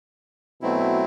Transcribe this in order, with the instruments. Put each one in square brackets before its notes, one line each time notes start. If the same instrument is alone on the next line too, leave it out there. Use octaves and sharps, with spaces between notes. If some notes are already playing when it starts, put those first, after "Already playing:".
[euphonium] B2 [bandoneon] F#3 A3 C4 E4